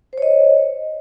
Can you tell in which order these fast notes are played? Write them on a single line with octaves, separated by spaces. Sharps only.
C5 C#5 D#5